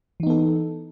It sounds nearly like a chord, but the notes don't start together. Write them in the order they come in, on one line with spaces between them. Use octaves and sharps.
E3 D#4 B3 A4